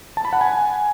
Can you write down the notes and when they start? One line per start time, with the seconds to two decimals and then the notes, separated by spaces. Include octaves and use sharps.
0.17 A5
0.25 B5
0.33 F#5
0.41 G#5